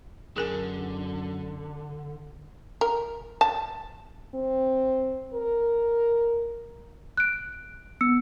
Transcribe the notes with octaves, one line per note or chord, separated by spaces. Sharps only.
F#2 D3 G#4 A#4 G#5
A#4
A5
C4
A#4
F#6 D7
B3 E6 C#7